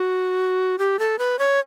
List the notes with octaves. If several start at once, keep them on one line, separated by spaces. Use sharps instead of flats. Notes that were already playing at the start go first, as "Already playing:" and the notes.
Already playing: F#4
G4
A4
B4
C#5